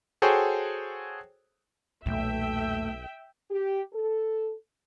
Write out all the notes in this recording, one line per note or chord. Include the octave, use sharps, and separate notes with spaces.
F#4 G#4 A4 C5 C#5 G5
B1 E2 A#2 A3 E5 G5
G4
A4